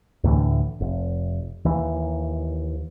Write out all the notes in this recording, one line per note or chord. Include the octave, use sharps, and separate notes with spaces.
D2 A2 D3 E3
F1
D#2 E3